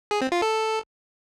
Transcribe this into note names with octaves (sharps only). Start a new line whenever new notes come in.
G#4
C4
F4
A4